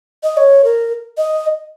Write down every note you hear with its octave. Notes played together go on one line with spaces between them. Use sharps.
D#5
C#5
A#4
D#5